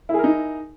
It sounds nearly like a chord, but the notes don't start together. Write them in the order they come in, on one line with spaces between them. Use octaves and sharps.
E4 G#4 A#4 D#4